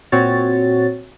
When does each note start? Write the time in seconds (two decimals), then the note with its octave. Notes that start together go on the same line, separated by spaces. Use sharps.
0.12 A#2 C4 F#4 C#5 A6